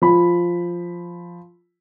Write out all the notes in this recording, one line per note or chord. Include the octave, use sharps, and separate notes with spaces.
F3 B5